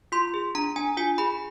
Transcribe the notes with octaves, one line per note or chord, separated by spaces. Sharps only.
F4 C6
G#4
D4 A#5
D4 G#5
F4 G#5
G#4 B5